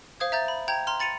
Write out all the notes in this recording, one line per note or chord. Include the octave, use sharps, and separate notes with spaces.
C5 F5 D#6 G#6
E5 A#5 G6 A6
B5
G5 A#5 G6 G#6 F7
A#5 C6 F6
B5 A6 C#7 D#7 F7